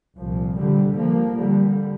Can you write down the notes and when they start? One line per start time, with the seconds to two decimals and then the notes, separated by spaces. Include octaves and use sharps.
0.15 C2 A#2 F3
0.56 D3 G3
0.97 F3 A#3
1.38 D3 G3